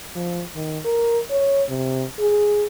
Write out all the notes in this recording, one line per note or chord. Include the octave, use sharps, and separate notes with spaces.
F3
D#3
A#4
C#5
C3
G#4